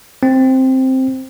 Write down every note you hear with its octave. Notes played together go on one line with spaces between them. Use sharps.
C4